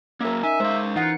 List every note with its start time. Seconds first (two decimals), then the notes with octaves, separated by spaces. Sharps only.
0.21 F#3 A#3 C#4 A#4 E5
0.43 D#4 E5 G#5
0.60 G#3 C5 F5
0.96 E3 D#4 F4 F#5